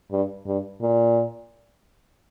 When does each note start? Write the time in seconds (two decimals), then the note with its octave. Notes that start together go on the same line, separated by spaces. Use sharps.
0.12 G2
0.47 G2
0.81 A#2